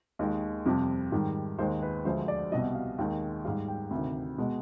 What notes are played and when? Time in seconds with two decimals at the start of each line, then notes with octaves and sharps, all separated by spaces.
0.19 D#2 D#3 G#3 D#5
0.66 F2 C3 G3
1.12 G#2 D#3 G3
1.59 D#2 D#3 G#3 C5
1.83 B4
2.05 D2 D3 F3 G#3 C5
2.28 D5
2.52 C2 B2 G3 D#5
2.75 F5
2.98 D#2 D#3 G#3 G5
3.45 G#2 G3 F5
3.68 G5
3.91 D2 C3 D#3
4.38 B2 G#3